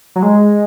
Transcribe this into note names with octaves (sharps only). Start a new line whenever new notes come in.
F#3
G#3